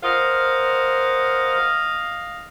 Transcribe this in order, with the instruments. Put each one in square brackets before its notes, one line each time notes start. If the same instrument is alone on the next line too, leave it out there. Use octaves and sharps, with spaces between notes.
[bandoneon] A#4 C5 F#5 [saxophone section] D#5 F5